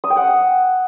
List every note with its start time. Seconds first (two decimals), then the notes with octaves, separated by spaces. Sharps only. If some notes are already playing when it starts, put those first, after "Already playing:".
0.04 D#6
0.10 G5
0.17 F#5